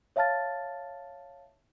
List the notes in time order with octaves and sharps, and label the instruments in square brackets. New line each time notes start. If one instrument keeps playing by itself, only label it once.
[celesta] C#5 E5 F5 A5 F6 A6